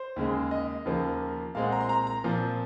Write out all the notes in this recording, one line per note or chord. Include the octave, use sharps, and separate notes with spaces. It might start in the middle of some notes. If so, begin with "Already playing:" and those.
Already playing: C5
D#2 C#3 G#3
D#5
D#2 C#3 F3 A#3
A#2 G#3 C4 F5
F#5
A#5
C6
A#5
A#5
A#2 F3 C4